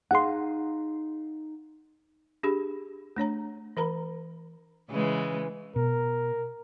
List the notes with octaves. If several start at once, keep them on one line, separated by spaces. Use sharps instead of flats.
D#4 G#4 F5 F#5 C6
D4 G4 G#4 B5
A3 D4 C#5 A#5
E3 A#4 A#5 B5
C#3 E3 G#3
B2 A#4